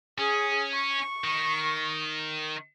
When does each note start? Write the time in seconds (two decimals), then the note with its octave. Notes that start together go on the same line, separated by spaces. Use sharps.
0.19 C#4 G#4
0.74 C#6
1.24 D#3